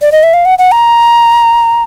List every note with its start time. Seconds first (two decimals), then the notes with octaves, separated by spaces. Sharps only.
0.02 D5
0.12 D#5
0.23 E5
0.34 F5
0.45 F#5
0.58 F#5
0.72 A#5